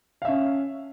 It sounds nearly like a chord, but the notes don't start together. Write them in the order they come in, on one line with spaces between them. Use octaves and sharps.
F5 E5 C#4